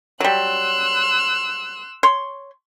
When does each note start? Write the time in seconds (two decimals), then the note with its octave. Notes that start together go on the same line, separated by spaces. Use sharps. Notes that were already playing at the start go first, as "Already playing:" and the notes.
0.20 F#3 G3 C6 E6 F#6
2.03 C#5 C6